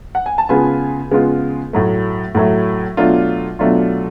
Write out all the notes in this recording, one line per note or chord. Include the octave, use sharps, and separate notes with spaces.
F#5
G#5
A5
C#3 G#3 B3 F4 G#5 B5
C#3 G#3 B3 F4
A2 F#3 A3
A2 F#3 A3
B2 F#3 A3 D4 F4
B2 F#3 A3 D4 F4